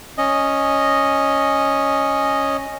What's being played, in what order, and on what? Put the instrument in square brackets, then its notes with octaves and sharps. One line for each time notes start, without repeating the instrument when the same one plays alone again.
[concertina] C#4 D#5